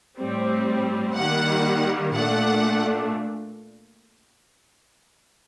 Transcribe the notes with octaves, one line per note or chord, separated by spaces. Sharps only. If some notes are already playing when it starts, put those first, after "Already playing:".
A2 G3 C4
D#3 G3 A#3 F#5
A#2 A3 D4 F#5